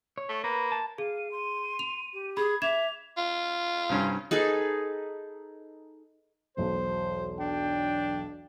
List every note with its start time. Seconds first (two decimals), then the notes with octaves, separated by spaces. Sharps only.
0.18 C#5
0.29 A3
0.44 A#3 B4
0.72 A5
0.98 G#4 F5 D#7
1.31 C6
1.79 F7
2.13 G4
2.37 G#4 B5 G#6
2.62 E5 D6 G#6 E7 F7
3.17 F4
3.89 C2 G2 C#4
4.31 D#4 G#4 A4 B4
6.57 E1 B1 C5
7.39 D4 G5